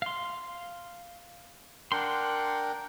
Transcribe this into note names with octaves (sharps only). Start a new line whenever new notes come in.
F5 C6
D4 A#4 F#5 G5 C6